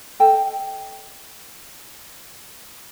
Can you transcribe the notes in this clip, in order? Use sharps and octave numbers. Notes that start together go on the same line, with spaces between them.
A4 D#5 G5 A5